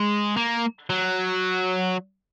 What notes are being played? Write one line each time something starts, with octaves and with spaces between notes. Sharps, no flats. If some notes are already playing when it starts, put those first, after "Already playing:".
Already playing: G#3
A#3
F#3